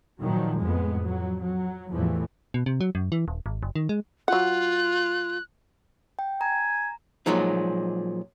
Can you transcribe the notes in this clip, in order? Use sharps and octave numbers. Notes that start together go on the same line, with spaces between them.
A#2 D#3 F3 F#3
F2 A2 G#3 B3
F2 F#3
F#3
E2 A2 E3 F3 G3 A3
B2
C3
F#3
F#2
E3
D#1
G#1
F#1
D#3
G#3
F#3 F4 F#5 F#6
G5
G#5 A#5
A#2 F3 F#3 G#3 D#4